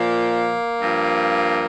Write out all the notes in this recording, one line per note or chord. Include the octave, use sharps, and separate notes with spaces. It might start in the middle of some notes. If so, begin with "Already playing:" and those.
Already playing: A#2 F3 A#3
G2 F3